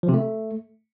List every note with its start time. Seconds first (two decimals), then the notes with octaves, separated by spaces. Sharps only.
0.03 F3
0.09 C3
0.14 A3